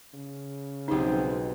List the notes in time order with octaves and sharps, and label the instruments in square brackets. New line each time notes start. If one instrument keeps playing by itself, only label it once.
[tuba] C#3
[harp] B1 C5 [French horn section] F3 G#3 C4 [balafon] D#4 G4